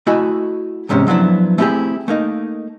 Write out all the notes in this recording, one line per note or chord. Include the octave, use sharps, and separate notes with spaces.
A3 E4 F#4 D#5 G#5
E2 G#2 C3 G#3 C#4
F3 F#3 B3 D4 E4
A3 C4 E4 F4 G4 G#4
A3 A#3 D#4